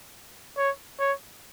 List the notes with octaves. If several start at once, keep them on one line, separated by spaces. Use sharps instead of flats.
C#5
C#5